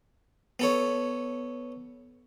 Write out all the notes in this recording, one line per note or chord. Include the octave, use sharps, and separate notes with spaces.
B3 A4 C#5